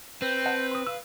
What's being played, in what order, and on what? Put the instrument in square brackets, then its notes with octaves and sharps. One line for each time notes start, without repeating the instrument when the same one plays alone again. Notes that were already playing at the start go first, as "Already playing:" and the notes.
[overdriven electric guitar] C4 [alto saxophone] B4 [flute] G6
[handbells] D#5 F#5 A5
[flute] C5 [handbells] C6 D#6
[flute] F5 [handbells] E6